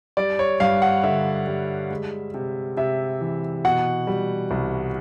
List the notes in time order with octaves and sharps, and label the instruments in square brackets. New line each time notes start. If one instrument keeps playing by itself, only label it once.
[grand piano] G3 D5
C#5
G2 F5
F#5
D3 E5
G3
G#3
C3
C3 E5
E3
B2 F#5
G3
C2